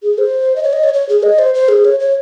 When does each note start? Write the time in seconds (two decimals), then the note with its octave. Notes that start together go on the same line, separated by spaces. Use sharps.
0.03 G#4
0.18 C5
0.56 D#5
0.63 C#5
0.73 D#5
0.84 C#5
0.94 C#5
1.09 G#4
1.23 D#5
1.39 C5
1.54 C5
1.68 G#4
1.85 C#5
2.00 C#5